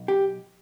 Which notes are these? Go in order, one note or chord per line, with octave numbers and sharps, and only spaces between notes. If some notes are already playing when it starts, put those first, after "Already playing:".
Already playing: B1
G4